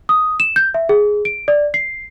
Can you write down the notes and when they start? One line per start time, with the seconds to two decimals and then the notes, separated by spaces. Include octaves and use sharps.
0.09 D#6
0.40 E7
0.56 G6
0.74 E5
0.89 G#4
1.25 D7
1.48 D5
1.74 C7